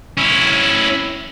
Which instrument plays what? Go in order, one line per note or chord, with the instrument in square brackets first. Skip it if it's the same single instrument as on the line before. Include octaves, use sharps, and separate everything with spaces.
[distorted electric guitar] C#4 E4